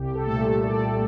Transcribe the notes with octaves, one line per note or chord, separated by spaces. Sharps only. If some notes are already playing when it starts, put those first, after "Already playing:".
Already playing: C2 G4
A4
A#2 A3
C2 D5